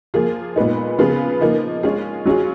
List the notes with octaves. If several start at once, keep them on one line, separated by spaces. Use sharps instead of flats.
F3 A#3 F4 G#4
A#2 G#3 B3 D#4
C#3 F3 B3 F4 G#4
F3 A#3 D#4
G#3 C#4 F4 G#4
F#3 C#4 F4 G#4